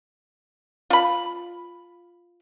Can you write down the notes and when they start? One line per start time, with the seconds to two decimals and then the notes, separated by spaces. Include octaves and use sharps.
0.90 F4 B5